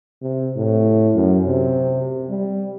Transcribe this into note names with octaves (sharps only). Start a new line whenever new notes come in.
C3
A2
F#2
C3
G3